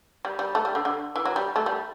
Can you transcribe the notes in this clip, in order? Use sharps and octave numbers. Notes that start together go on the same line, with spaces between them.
G3
G3
A3
G3
D3
D3
E3
F#3
G3
A3
G3